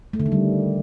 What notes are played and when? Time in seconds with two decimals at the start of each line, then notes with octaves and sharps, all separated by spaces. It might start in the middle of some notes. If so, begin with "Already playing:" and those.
0.13 A3
0.20 D3
0.26 D#3
0.32 G3